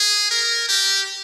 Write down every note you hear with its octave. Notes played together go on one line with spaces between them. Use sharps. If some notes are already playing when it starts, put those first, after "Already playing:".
Already playing: G#4
A#4
G4